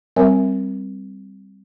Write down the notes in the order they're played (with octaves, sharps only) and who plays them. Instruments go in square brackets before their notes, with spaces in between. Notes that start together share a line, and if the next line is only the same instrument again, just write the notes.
[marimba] G3 C4 A#4 C#5 E5 G#5